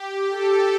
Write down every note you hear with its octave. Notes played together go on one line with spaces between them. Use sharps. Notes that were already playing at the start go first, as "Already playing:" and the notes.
Already playing: G4
A4